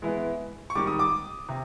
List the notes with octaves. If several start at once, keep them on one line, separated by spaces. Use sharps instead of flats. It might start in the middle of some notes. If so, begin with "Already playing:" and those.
E3 G#3 B3 E4
C#6
G#2 D#3 G3 D6
D#6
D6
C3